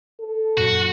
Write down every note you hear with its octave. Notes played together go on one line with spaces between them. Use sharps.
A4
F#2 A#2 F#4